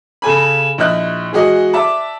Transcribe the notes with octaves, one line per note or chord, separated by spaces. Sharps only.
C#3 A4 G#5 B5
A#1 E4 D#5 F#6
E3 G#3 F#4 G#4 D#5
D5 E5 A5 D6